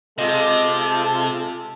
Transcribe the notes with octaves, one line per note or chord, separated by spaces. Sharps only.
C3 G#3 F4 A4 D#5
A5